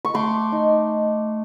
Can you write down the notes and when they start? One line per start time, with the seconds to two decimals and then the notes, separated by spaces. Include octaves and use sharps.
0.05 C#6
0.14 A3 C6 D6
0.52 D#4